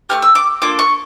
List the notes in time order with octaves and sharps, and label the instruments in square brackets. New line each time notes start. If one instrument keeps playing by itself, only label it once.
[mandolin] A3 C#4 G4 F6
E6
D6
A#3 D4 F4 A4 D6
C#6